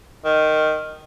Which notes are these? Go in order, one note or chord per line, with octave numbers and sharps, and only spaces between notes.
D#3